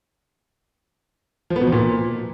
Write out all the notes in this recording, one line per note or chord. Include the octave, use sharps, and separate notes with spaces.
F3
B3
B2
F3
A#2